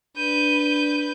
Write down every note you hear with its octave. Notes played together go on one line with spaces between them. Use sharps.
D4 B4 G6 D#7